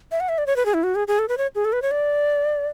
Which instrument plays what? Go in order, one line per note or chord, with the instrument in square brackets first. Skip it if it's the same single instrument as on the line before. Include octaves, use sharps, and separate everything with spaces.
[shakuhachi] E5
F#5
E5
D5
C#5
B4
G#4
E4
F#4
G#4
G#4
A4
B4
C#5
G#4
A4
B4
C#5
D5